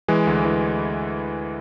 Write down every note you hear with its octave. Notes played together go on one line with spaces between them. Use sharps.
E3 G#3
D2
E3